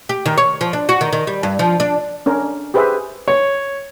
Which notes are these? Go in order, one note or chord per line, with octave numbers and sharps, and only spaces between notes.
G4
D#3
C#5
F3
D4
F#4
D#3
D#3
G3
G2
F3
D4
C#4 D4 A#4 C#5
G4 G#4 B4 C5 E5 G#5
C#5